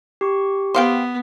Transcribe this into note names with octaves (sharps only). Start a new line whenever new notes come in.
G4 C#6
B3 C5 F5 G5